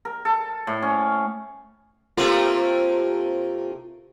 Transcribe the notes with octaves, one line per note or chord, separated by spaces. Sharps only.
A#4
A4
A2
C#4
C3 A3 A#3 F4